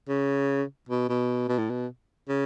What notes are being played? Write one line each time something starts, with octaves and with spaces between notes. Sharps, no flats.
C#3
B2
B2
B2
A2
B2
C#3